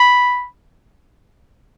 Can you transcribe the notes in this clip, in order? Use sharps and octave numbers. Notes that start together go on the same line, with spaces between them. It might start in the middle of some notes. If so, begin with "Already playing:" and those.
Already playing: B5